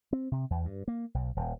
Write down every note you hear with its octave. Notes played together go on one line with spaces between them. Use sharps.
C4
C3
E2
G2
A#3
B1
D#1